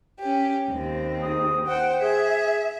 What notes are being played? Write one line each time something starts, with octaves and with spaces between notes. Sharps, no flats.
C#4 G4
D#2 C4
G#2 D#4 D#6
C5 F#5 G5
G#4 E5